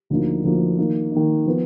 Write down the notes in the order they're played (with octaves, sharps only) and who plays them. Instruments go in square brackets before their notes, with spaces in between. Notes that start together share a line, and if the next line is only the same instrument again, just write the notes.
[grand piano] D2 D3 F3 A#3 D#4
D2 D3 F3 A#3 D#4
D#3 A#3 D#4
D#3 A#3 D#4
F3 B3 F4